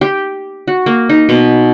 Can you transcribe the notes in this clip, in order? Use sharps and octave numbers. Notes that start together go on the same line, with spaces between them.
G4
F#4
A#3
D#4
B2